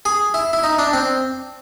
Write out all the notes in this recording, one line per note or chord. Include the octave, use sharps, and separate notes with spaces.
G#4
E4
E4
D#4
D4
C4